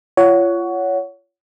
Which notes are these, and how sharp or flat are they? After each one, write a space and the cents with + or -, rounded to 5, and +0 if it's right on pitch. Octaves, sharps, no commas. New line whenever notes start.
F4 -30 C#5 +20 F#5 +0